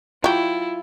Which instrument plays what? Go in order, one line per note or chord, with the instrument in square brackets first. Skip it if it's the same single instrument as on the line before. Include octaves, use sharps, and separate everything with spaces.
[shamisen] F#3 G4 [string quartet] E4 [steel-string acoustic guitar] F4